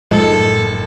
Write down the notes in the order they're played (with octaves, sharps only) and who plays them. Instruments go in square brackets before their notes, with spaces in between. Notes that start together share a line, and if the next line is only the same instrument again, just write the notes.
[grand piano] F#1 C#7 [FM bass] A2 [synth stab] F3 G#3 D#4 [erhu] A4